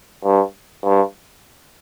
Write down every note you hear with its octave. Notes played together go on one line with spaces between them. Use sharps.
G2
G2